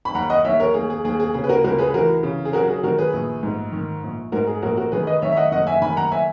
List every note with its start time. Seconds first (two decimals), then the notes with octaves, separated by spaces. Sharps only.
0.05 B5
0.14 D#2 F#5 A#5
0.30 D#5 F#5
0.45 D#2 C#5 E5
0.60 A#4 C#5
0.74 D#2 G#4
0.90 G#4
1.04 D#2 G#4
1.20 G#4
1.34 C#3 G#4
1.44 B4
1.49 F#4 A#4
1.64 C#2 F#4 A#4
1.79 G#4 B4
1.94 E3 F#4 A#4
2.23 C#3
2.45 G#4
2.53 F#3 F#4 A#4
2.64 F#4
2.69 G#4
2.83 D#3 F#4 A#4
2.99 G#4 B4
3.13 A#1
3.43 G#2
3.72 D#3
4.03 A#1
4.32 G#2 F#4 A#4
4.47 G#4
4.62 A#1 F#4 A#4
4.77 F#4 A#4
4.92 D#3 G#4 B4
5.07 B4 D#5
5.22 D#3 C#5 E5
5.32 E5
5.36 D#5 F#5
5.52 F#1 D#5 F#5
5.67 E5 G#5
5.82 D#3 G#5 B5
5.97 F#5 A#5
6.11 E5 G#5